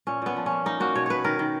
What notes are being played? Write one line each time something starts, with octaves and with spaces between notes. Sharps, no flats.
A#2 C#4
A#2 B3
F3
A#3 C#4
A#3 D#4
A#3 F#4
B2 C#5
B2 B4 C#5
D#3 A#4
D#3